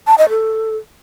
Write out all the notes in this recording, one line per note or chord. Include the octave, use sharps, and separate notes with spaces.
A5
D#5
A4